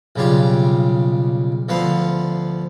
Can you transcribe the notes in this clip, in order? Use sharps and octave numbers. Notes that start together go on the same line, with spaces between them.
B1 C#3 G3 F4 G4
D2 F3 B3 C5 F5